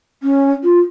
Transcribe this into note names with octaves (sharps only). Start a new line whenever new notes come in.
C#4
F4